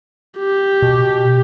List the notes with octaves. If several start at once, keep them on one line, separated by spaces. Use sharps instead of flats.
G4
B2